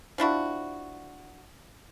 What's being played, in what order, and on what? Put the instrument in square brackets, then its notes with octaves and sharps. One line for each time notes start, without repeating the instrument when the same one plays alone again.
[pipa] F3 D4 E4 F#4